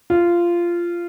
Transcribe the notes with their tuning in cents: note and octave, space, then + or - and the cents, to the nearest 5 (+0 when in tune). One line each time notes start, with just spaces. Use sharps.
F4 -15